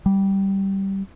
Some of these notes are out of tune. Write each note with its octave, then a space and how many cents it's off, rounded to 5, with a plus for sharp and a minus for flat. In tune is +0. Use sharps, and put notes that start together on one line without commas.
G3 -10